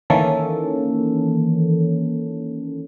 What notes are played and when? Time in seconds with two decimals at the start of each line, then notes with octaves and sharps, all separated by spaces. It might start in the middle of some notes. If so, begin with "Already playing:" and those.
0.10 D#3 E3 A#3 C#4 A4